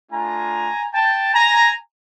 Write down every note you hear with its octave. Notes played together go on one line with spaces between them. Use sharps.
A3 D4 F4 G#5 A#5
G5 A5
G#5 A#5